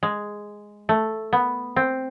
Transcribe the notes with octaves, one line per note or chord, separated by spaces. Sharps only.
G#3
A3
B3
C4